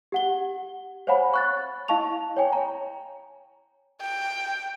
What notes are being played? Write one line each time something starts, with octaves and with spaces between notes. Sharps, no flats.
G4 F#5 G7
C5 C#5 F5 F#5 G#5 B5
C#6 F#6 A6
E4 D#5 F5 A5 C#6 F7
C#5 G5 G#5
A#5
G5